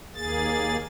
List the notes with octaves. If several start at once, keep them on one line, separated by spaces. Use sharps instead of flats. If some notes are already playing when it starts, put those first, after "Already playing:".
D#2 A#3 G#4 A6